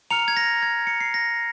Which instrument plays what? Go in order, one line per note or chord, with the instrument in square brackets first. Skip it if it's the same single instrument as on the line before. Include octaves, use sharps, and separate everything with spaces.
[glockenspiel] A#5 F6 C#7 F7
G#6
A#6
G#6
C#7
C7
A#6